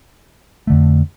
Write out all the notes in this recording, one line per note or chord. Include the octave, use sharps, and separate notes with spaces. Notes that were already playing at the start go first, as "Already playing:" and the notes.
F2 D3 A3